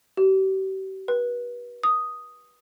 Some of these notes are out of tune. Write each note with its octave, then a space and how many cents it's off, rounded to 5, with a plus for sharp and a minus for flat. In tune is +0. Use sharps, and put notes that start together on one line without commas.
G4 -40
B4 -30
D#6 +0